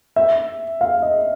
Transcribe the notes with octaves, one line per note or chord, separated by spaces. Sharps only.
E5
F5
D#5